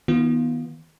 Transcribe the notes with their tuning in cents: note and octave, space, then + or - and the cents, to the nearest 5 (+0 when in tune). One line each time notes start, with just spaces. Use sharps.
D#3 +25 B3 -20 F4 +0